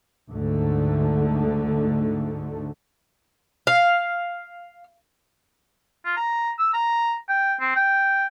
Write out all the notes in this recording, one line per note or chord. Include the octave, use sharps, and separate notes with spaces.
D2 G#2 D3 A3
F5
F4
A#5
E6
A#5
G5
C4
G5